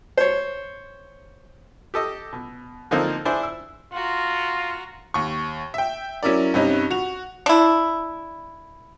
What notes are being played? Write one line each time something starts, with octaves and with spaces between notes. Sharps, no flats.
C5 C#5
G4 A4 D#5
B2
D3 F3 A#3 C4 D#4 A4
D4 E4 G#4 C5
E6
F4 F#4 A#5
D#2 C#6
E5 G5
F#3 C#4 E4 A#4 D5
G2 C3 C#4 D#4
F#4 F7
D4 E4